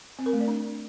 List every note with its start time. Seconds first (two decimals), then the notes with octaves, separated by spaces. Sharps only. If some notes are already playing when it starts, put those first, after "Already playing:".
0.19 C4
0.26 A#4
0.33 A3
0.41 D5
0.48 D4